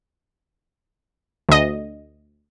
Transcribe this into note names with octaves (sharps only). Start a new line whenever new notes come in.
D2 D#5